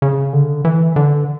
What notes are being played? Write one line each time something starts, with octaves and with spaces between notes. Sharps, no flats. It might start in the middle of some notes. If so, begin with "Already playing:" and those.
C#3
D3
E3
D3